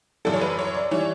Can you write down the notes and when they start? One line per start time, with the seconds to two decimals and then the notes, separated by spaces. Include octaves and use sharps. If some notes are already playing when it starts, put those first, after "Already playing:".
0.25 F#2 E3 G3 A4
0.33 C#5
0.41 B4
0.59 C#5
0.75 D5
0.91 E3 G3 C#5